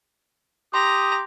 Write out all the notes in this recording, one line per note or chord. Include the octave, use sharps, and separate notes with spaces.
G4 A#5 C6 D#6